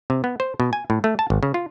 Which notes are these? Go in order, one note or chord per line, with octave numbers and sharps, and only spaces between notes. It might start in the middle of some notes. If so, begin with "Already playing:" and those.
C3
B3
C5
B2
G#5
A2
A3
A5
G#1
C#3
F4